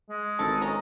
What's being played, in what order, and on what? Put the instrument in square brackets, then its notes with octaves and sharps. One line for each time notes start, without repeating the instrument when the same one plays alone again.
[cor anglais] G#3
[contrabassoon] G#1 [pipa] A4
[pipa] C#4 A#5 [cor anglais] D#5